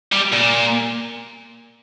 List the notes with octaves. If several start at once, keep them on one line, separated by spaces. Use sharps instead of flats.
G3
A#2